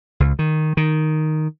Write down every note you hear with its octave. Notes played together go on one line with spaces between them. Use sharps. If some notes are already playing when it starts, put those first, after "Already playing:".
C#2
D#3
D#3